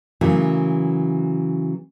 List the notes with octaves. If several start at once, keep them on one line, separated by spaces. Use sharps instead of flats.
C#3 E3 F#3 A3 A#3